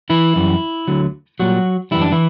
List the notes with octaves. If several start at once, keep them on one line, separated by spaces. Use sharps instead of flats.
E3 E4
F#2 E3 G3
D2 D3 F#3
A#2 F#3 G3 F#4
F#2 E3 G3 E4
D4
E3 E4